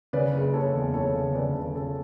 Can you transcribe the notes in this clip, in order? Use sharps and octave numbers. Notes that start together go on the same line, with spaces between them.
C#3 B4 D5
F#1
F#1 A4 C#5
E2
F#1 A4 C#5
C#3
C#3 B4 D5
C#3 A4
C#3 A4